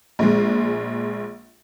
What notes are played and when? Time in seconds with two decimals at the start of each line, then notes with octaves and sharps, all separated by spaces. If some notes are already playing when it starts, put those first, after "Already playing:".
0.19 A#1 G#3